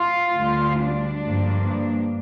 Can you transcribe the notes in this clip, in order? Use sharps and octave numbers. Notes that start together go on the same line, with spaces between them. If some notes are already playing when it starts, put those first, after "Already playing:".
Already playing: F4
D2 D3 G3
D4
G2 F3 A#3